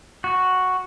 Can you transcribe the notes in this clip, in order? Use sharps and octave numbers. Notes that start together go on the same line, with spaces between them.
F#4